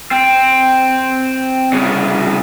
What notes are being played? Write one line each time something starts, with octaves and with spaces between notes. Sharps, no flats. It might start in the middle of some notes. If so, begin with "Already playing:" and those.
C4
C2 C#3